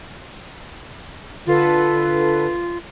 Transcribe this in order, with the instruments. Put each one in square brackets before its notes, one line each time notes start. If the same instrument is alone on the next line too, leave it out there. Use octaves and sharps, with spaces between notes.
[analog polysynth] D3 A4 B4 [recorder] F4